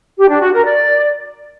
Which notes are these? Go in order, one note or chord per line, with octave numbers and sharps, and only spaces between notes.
G4
D4
F#4
A#4
D5